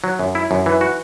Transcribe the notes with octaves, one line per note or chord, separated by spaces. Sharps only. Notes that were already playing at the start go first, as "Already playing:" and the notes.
F#3
F#2
E4
F#2
E3
F#4